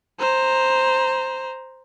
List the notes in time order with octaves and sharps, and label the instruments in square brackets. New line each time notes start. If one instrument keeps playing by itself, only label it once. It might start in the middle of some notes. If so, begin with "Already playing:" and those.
[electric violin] C5 A#5